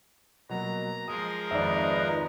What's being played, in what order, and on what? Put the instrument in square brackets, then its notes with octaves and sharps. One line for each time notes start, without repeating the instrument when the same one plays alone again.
[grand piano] B2 F#3 A#3 [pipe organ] A#5
[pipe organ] F3 G#3 A#4 [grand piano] A#5 D#6
[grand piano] G#1 F2 [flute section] D#4 F4 B4 [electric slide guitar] D5 E5